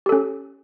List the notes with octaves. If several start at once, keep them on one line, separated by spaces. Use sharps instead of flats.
C#4 G4 A4